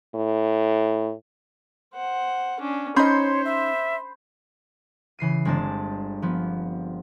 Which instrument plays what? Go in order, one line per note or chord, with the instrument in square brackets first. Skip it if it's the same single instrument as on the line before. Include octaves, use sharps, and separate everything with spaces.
[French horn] A2
[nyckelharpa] C5 F#5
C#4 D4
[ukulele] C#4 D#4 D#5 [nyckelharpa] C5 [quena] C#5 [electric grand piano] B5 C6 G6
[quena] E5
[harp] C#3 E3 C7 D#7
G1 G#3 C4 D4 A5
F3 B3